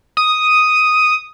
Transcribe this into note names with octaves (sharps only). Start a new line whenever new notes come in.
D#6